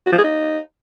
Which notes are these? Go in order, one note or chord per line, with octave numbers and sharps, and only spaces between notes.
F#4
F3
G#4
D#4